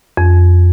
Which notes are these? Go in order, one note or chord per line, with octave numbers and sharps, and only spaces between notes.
F2